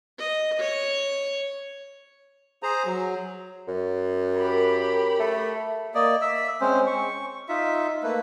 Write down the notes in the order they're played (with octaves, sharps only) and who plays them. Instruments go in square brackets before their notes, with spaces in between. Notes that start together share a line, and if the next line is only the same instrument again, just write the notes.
[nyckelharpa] D#5
C#5
[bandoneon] G#4 C5 A#5
F#3
[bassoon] F#2
[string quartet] G4 A#4 B5
[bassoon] A3
[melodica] A#3 D5 D#5
E5 E6
G#3 C4 C#4 C5
C#6
D#4 F4 E5
A3 A#3 B4